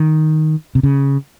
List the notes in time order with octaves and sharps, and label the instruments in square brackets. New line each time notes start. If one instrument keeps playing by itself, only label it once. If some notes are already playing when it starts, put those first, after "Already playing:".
Already playing: [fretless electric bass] D#3
C3
C#3